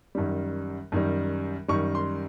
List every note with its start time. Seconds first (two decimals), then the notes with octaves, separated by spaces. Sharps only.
0.15 F#2 D#3 G3
0.92 F#2 D#3 G3
1.68 F#2 D#3 G3 C#6
1.95 C6